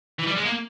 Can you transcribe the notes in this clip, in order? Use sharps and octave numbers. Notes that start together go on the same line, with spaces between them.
E3
G3
G#3
A#3